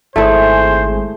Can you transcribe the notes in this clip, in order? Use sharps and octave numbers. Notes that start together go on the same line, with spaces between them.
G#1 A3 E4 G#4 C5